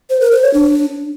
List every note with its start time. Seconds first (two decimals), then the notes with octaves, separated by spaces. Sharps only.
0.10 C5
0.21 A#4
0.32 C5
0.43 C#5
0.54 D4